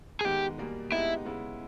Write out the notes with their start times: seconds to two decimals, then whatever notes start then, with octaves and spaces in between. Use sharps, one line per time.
0.21 G#4
0.24 D#3 G#3 B3 G4
0.58 E2 B2 G3 A#3
0.92 G#3 B3 D#4 E4 G4
1.25 C#3 G#3 B3 E4